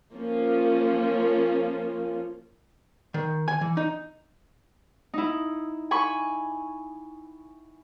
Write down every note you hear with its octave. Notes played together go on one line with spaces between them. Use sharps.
F3 A#3 C#4 F4
D#3
G#5
E3
D#4
D#4 E4
G#5 B5 C#6